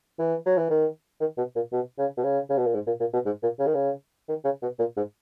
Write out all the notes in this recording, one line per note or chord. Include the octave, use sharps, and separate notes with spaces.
E3
F#3
E3
D#3
D#3
B2
A#2
B2
C#3
B2
C#3
C#3
B2
A#2
G#2
A#2
A#2
B2
G#2
A#2
C#3
D#3
C#3
D#3
C#3
B2
A#2
G#2